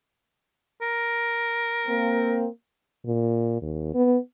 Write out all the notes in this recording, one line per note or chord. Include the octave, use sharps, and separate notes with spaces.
A#4
A#3 C4
A#2
D#2
B3